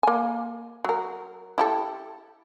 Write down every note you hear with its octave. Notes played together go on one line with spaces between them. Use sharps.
A#3 G#5
F#3 A#4
E4 G4 A4